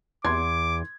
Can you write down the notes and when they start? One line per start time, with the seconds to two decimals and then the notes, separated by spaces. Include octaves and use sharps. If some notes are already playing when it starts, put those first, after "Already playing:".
0.25 E2 C6 D6 G#6